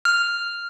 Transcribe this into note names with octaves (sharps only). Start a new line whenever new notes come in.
F6